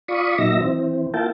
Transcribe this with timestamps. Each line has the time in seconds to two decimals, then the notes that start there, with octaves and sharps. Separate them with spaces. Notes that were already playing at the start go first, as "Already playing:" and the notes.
0.08 F4 D5 B5 C#6 D#6
0.38 A#2 F#3 D#4 E5 A#6
0.61 E3 C4
1.14 A#3 E4 F4 G5 A5